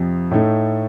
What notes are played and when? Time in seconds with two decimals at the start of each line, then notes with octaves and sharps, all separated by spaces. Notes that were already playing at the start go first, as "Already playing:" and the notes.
Already playing: F2 C3 F3
0.31 A2 A3 D#4